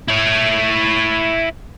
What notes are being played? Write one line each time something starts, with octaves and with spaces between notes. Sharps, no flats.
E4 C#5